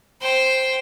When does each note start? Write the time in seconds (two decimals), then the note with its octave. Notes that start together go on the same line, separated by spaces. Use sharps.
0.21 C5 G5